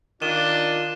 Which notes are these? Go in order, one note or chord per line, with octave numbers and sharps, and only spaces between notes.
D#3 D4 F4 D5 D#7 E7 G7